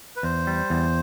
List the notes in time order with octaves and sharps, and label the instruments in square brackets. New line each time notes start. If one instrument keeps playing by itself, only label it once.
[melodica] B4
[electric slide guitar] E2 [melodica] C5
[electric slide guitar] G3
E2